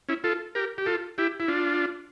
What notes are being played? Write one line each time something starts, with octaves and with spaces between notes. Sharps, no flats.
C#4 E4
F4 A4
G4 A#4
G4
F4 A4
E4 G4
E4
D4 F4